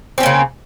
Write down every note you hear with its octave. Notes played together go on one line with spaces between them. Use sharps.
C#3 A#3 C4 C#4